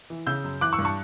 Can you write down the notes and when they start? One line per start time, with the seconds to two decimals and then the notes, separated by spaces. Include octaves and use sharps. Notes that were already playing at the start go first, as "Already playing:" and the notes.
0.10 E3
0.27 C#3 E6 G6
0.44 F#2
0.61 E3 D6 F#6
0.73 C#6 E6
0.79 G2
0.85 A5 C#6